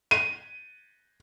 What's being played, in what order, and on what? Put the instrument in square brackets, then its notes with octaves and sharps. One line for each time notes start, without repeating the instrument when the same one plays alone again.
[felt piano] D#7